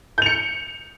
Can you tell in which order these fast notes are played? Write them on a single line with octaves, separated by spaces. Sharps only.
G6 F7 C#7